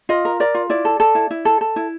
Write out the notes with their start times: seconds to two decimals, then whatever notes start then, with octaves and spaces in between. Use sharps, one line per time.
0.09 F4 D#5
0.25 A#4
0.40 A#4 D5
0.55 F4
0.70 E4 D5
0.85 A4
1.00 A4
1.15 E4
1.31 E4
1.45 A4
1.61 A4
1.76 E4